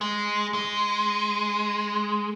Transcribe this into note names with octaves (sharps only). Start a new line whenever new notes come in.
G#3
G#3